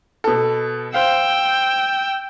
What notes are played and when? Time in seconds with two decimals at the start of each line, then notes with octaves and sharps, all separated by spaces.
0.24 B2 A4
0.94 C5 F5 G5 E6